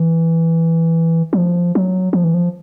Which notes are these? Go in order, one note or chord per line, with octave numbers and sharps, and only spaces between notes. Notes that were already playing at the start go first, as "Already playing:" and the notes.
Already playing: E3
F#3
F3
F#3
F3
E3
F3